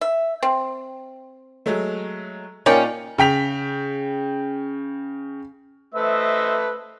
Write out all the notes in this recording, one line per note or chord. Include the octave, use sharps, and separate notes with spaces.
E5
C4
F#3 G#3 A3
A#2 C#4 D#4 F4 A#4 D5 G5
C#3 G5 B6 F7
A3 B4 C5 D#5 E5 E6